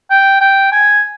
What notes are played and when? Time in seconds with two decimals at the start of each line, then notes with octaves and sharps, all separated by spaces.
0.11 G5
0.41 G5
0.72 G#5